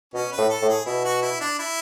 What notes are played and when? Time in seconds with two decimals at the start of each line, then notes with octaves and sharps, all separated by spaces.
0.14 B2 C#4
0.32 B4
0.38 A2
0.50 A4
0.62 A2
0.69 G#4
0.86 B2 E4
1.05 F#4
1.22 E4
1.40 D4
1.59 E4